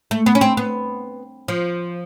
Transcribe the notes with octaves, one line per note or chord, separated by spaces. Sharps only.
A3
B3
C#4
C4
B3
F3